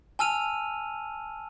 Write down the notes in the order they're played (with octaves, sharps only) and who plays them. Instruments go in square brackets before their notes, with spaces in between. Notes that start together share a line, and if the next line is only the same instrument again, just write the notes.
[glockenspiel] G#5 A5 E6 F6 D#7 F7